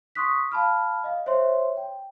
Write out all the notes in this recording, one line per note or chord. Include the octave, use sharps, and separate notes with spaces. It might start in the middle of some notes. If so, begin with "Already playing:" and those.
C6 C#6 D#6 F#6 B6
F5 A5 B5 F6
D#5 F5
C5 C#5 E5 C6
G5